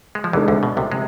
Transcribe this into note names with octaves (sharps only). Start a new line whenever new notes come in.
G#3
F3
E2 C3 E3 G#3 D4 A4
D2 D3
B2
C2 C3
C3 G#3